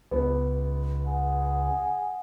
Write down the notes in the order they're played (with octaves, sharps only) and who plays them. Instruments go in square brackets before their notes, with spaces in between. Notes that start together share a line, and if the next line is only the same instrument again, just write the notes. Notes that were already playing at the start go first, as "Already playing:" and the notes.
[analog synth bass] C#2 [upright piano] B3
[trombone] G#4 [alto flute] F#5